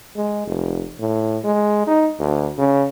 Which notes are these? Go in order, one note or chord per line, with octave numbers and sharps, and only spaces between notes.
G#3
F1
A2
G#3
D#4
D2
C#3